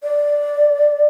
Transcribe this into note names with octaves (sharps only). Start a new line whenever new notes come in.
D5